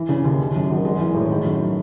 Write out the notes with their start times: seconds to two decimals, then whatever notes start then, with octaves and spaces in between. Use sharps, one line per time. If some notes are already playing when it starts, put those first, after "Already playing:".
Already playing: E3
0.09 C#3
0.24 D#2
0.40 D#3
0.55 F#2
0.69 G#1
0.85 G#3
0.99 E3
1.14 A2
1.29 D#3
1.45 F#2